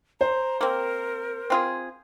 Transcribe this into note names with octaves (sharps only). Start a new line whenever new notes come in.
C5 A#5
A#3 C4 A#4
C4 F4 G#4